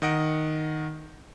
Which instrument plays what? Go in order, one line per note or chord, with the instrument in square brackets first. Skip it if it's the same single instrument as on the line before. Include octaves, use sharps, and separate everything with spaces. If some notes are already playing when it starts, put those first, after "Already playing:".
[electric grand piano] D#3 D#5 F#5 D7